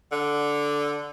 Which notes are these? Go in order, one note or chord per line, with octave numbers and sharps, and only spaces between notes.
D3